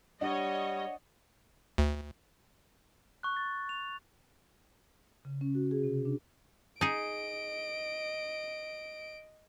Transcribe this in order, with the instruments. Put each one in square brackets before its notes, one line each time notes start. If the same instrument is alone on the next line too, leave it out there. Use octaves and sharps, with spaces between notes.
[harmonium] G3 [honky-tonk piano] D4 [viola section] C#5 D#5 [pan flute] F#5
[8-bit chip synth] D2
[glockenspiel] C#6 F#6
A6
F7
[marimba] C#3
C#4
F#4
G#4
C3
D4
[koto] D#4 G#4 [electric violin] D#5 D7